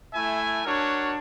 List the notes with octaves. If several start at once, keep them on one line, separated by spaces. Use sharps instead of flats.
A3 E4 E5 G#5
D4 F#4 A#4 C#5